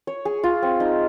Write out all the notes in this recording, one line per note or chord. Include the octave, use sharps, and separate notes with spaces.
C#5
G#4
F4
C4
D#4